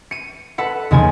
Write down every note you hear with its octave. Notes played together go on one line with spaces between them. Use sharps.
C#7 D#7
A4 B4 F#5
D#2 C#3 F3 G#5 D#7